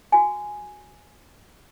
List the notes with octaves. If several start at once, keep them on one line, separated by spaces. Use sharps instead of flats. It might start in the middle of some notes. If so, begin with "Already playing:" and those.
F#4 G#5